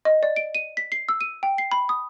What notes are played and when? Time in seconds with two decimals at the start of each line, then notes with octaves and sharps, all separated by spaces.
0.05 D#5
0.23 D5
0.36 D7
0.55 D#7
0.77 B6
0.92 C7
1.09 E6
1.21 D#7
1.43 G5
1.58 C7
1.72 B5
1.89 D#6